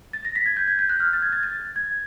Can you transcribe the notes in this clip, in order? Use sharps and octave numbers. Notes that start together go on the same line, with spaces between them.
A6
A#6
B6
G#6
G6
G#6
G6
F#6
F6
A6
G#6
A6
A6
G#6